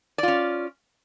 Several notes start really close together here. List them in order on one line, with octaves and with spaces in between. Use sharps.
D5 F4 C#4